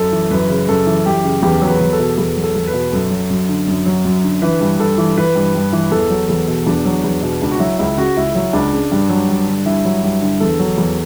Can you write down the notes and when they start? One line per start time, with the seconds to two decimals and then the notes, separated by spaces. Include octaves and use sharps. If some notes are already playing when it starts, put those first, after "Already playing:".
Already playing: F#2 A4
0.12 E3
0.31 F#2 B4
0.50 C#3
0.69 F#2 A4
0.87 E3
1.06 F#2 G4
1.25 C#3
1.42 E2 G4
1.62 F#3
1.67 B4
1.81 E2
1.93 A4
1.99 B2
2.17 E2 A4
2.37 F#3
2.43 A4
2.56 E2
2.68 B4
2.74 B2
2.93 F#2 A4
3.11 F#3
3.30 F#2
3.49 D3
3.68 F#2
3.86 F#3
4.05 F#2
4.24 D3
4.42 E3 B4
4.61 G2
4.79 G2 A4
4.98 E3
5.18 E3 B4
5.36 G2
5.55 G2
5.73 E3
5.92 E2 A4
6.10 F#3
6.29 E2 A4
6.48 B2
6.66 E2 D4
6.85 F#3
7.04 E2
7.23 B2
7.41 C#2 D4
7.51 F#4
7.60 F#3 E4
7.78 C#2 E4
7.97 C#3 F#4
8.17 C#2 E4
8.35 F#3
8.53 C#2 D4
8.73 C#3
8.92 G2
9.09 F#3
9.29 G2
9.47 D3
9.66 G2 E4
9.85 F#3
10.03 G2
10.22 D3
10.40 E2 A4
10.59 F#3
10.78 E2